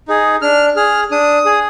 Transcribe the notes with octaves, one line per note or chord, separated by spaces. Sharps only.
D#4 G#4
D4 F6
G#4 F6
D4 D#6
G#4